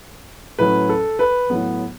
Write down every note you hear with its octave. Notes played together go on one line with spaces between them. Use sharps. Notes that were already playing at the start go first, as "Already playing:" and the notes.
A2 F#3 C#4 B4
A4
B4
A2 F#3 B3